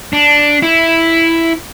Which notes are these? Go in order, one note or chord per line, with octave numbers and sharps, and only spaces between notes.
D4
E4